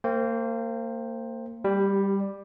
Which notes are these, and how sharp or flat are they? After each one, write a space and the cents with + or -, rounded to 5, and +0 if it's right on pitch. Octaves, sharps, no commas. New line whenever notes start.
A#3 -30 C5 +5 G5 +0
G3 +10 G4 -20